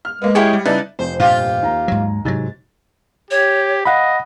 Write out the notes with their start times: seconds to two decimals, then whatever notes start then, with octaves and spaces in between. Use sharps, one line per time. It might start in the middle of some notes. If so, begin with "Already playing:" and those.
0.05 F6
0.22 G#3 A#3 B3
0.35 E4 G4 G#4 C#5 G#6 C#7
0.53 G3
0.66 C#3 G3 D#4 E4 B4 D5 A5
0.99 F1 F3 C5
1.20 G2 A#2 F4 G4
1.63 D#2 A#5
1.88 G#2 F#3
2.25 G#2 C3 F#3 A6
3.31 G4 C#5
3.85 D#5 F5 F#5 B5